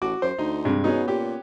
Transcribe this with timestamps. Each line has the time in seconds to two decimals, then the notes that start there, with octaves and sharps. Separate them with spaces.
0.02 A1 F#4 D6
0.22 F#2 C5
0.38 D2 D#4
0.65 G2 C3 G#3
0.84 B2 B3 C#4 D#4 G#4
1.08 A#2 G4